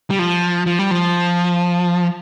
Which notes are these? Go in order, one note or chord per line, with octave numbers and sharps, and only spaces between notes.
G3
F3
F3
G3
F3